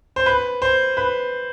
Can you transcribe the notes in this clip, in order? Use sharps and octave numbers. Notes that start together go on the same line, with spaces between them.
C5
B4
C5
B4